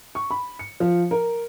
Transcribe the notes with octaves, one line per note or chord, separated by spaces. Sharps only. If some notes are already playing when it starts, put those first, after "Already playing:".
C#6
B5
C#7
F3
A#4